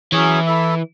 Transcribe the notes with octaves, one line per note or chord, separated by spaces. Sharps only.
E3 F#3 C#4 G#4 C#5
E4 A4 E5